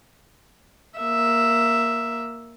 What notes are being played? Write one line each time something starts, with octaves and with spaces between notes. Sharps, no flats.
A#3 E5